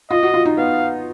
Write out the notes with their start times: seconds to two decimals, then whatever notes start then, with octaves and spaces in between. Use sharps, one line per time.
0.11 F4 D#5
0.23 F#4
0.34 F4
0.45 D#4
0.57 B3 F5